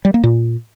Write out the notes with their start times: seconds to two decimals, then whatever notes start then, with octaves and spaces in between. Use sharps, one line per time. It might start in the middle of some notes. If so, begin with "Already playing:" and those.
0.05 G3
0.14 A#3
0.24 A#2